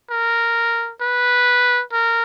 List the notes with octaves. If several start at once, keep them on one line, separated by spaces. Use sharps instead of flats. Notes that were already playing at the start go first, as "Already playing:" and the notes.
A#4
B4
A#4